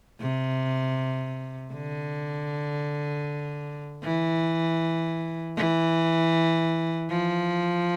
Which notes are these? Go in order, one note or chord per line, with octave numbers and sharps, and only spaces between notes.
C3
D3
E3
E3
F3